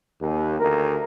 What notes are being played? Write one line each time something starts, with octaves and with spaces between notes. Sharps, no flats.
D#2
D2 A#4